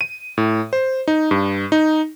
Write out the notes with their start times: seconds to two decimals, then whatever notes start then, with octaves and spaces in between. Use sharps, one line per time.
0.01 D#7
0.38 A2
0.73 C5
1.08 D#4
1.31 G2
1.72 D#4